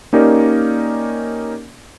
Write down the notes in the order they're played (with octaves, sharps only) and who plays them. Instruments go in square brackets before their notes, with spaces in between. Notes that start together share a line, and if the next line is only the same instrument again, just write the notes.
[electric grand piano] A#3 C#4 D#4 G4 A#4 D5